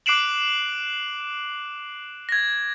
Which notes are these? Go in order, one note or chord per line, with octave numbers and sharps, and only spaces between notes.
D6 F#6 C7 D7 E7 F#7
G#6 A#6